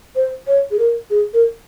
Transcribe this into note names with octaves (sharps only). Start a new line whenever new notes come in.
C5
C#5
G#4
A#4
G#4
A#4